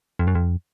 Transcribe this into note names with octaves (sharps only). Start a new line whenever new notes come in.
F2
F#2
F2